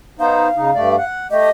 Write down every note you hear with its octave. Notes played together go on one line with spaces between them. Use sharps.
B3 D#4 C5 F5
C#3 D#4
G2 A3 D5
F#5
A3 G4 D#5